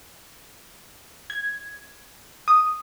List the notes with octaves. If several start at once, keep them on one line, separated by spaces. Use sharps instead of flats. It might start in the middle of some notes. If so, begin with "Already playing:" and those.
G#6
D#6